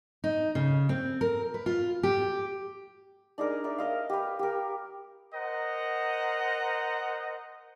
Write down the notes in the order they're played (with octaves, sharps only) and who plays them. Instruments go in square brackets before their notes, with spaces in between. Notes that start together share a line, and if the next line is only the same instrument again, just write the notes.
[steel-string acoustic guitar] D#4
C#3
C4
A#4
B4
F4
G4
[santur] D4 D#4 G#4 A#4
A#4 D5 E5
A#4 D#5 F5
G4 B4
G4 A#4
[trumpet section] A#4 C5 D#5 F#5 A#5